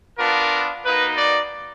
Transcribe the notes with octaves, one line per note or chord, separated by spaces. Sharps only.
B3 D4 F4 A#4
A#3 D#4 F#4 B4
D5